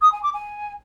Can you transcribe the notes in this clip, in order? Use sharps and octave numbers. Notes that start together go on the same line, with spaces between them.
D#6
G#5
D6
G#5